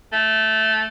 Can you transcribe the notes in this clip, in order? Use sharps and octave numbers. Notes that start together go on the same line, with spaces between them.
A3